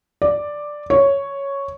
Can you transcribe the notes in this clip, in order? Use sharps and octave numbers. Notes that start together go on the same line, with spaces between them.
D5
C#5